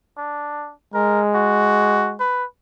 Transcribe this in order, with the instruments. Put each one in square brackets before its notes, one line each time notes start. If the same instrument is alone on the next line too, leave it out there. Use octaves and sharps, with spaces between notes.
[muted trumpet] D4
[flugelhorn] G#3 [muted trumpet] A#4
[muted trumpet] F#4
B4